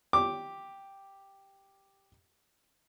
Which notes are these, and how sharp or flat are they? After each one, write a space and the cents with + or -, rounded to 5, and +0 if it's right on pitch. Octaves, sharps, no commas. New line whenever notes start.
G4 +0 D6 +0